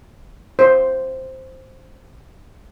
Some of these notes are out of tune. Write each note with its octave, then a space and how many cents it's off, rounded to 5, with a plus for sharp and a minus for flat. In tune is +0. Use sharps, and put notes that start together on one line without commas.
C5 +5